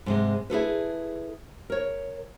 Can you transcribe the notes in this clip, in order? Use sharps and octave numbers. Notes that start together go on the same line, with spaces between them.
G#2 C3 G#3
E4 G#4 A4 B4
A#4 C#5